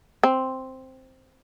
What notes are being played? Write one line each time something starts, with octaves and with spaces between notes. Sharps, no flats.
C4